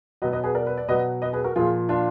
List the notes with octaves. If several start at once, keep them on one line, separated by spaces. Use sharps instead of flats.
B2 F#3 B4 D#5
B4 D#5
G#4 B4
A#4 D5
B4
D5
B2 F#3 B4 D#5
B4 D#5
G#4 B4
F#4 A#4
A#2 F3 F4 G#4
D4 F4